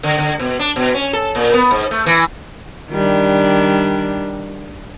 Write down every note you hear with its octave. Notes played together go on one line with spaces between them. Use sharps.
D3
D3
B2
D4
B2
C#4
A4
A#2
B3
G#2
A3
E3
D#3 G3 D4